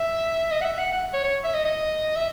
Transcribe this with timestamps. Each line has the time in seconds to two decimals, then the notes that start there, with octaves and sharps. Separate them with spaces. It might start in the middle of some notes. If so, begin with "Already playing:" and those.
Already playing: E5
0.51 D#5
0.61 F#5
0.65 E5
0.78 F#5
0.92 F#5
1.13 C#5
1.24 C#5
1.44 E5
1.54 D#5
1.65 D#5
2.16 E5